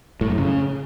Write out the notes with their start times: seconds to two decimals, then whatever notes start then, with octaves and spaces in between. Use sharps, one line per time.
0.21 A2
0.30 F#2
0.38 C#3